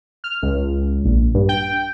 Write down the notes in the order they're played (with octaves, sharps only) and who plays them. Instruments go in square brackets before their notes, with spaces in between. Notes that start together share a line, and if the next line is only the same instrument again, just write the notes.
[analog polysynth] F6
C#2
A#1
G2
G5